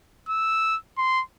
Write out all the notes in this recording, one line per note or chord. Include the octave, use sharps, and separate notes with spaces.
E6
C6